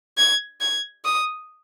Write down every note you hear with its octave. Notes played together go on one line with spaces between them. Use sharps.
G#6
G#6
D#6